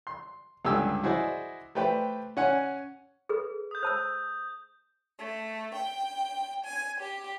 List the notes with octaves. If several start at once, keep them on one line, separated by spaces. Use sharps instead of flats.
C6
C#2 G2 D3 G4 G#5 E6
E4 F#4 G#4 C5 D5 D#5
A3 G4 B4 C5 G5
C#4 F#5 G#5
G#4 A4 B4
D#6 G6
C5 A5 E6
A3
G5
G#5
G4